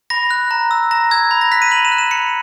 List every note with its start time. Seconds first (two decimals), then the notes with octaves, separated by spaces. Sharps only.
0.10 B5 A#6
0.31 F#6
0.51 A#5
0.71 E6
0.91 A#5 A#6
1.11 E6 G#6
1.31 B5
1.41 A#6
1.52 F#6 B6
1.62 D#7
1.71 B5 F#7
1.85 E7
1.92 F#6
1.98 E7
2.11 B5 C#7